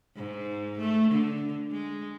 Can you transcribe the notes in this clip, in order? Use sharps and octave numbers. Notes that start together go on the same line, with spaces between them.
G#2
A3
D3
G#3